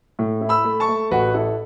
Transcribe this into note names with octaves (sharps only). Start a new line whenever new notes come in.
A2
E4
B5 E6
A3
A5 C#6
A3
A1 F#4 B4
E4 A4